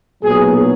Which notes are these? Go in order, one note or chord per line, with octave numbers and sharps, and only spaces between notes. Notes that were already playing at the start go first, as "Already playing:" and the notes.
B1 A#2 F#3 B3 G#4